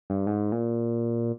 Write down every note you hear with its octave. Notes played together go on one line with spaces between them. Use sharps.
G2
G#2
A#2